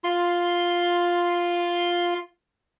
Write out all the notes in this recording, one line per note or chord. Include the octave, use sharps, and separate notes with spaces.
F4 C6